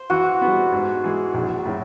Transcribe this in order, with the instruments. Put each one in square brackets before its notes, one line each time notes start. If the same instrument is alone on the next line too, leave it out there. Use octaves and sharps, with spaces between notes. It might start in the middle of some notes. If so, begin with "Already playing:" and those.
Already playing: [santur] C5
[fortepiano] E3 [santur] F#4
[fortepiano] G3 B3
G#2
E3 G#3
A#1
A2 F#3